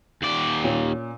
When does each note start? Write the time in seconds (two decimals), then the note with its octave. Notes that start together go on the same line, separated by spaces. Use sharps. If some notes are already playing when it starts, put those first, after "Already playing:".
0.22 D#2 D5
0.64 A#2 C#4